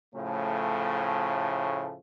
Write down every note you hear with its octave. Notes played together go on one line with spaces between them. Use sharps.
A2 C#3 F3 A3